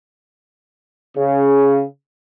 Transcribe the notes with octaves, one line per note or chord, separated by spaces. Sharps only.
C#3